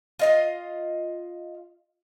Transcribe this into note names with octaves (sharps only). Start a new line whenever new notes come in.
F4 D#5 F5